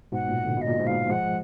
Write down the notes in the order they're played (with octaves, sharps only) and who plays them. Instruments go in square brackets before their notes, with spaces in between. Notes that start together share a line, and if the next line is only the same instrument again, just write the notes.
[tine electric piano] G#2 B2 [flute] F#5
[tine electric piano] A#2
D3
[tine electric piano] B2 [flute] D#5
[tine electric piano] A#2
G#2 B2
[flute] F5
[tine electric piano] F3 G#3 [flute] F#5